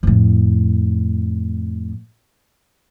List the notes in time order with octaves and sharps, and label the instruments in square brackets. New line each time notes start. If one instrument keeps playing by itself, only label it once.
[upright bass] F2 A2